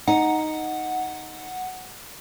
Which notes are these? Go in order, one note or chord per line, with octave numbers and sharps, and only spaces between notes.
D#4 F#5